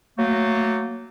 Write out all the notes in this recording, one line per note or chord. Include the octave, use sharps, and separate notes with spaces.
F#3 A3 A#3